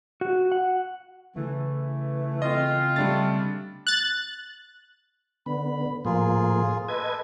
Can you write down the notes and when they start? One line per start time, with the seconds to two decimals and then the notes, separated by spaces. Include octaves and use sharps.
0.21 F#4
0.52 F#5
1.36 C#3 E3 A3
2.42 G#3 C4 F4 D#5
2.96 G3 A3 D4 A6
3.87 F#6 A6
5.46 D3 B3 B5
6.05 A2 F3 A#3 F4 G#4
6.88 A4 B4 D#5 G#6